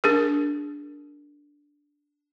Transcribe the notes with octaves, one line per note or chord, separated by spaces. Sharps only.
D4 G#4 A#4